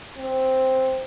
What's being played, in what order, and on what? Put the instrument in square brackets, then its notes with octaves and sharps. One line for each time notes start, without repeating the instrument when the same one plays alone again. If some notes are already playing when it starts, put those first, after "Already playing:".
[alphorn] C4